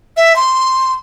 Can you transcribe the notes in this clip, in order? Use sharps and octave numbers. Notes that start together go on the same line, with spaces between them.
E5
C6